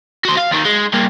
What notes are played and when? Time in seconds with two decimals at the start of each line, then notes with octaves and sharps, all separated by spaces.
0.25 F#4 C5
0.37 F5
0.51 D#2 D#3
0.65 G#3
0.93 G2 A#3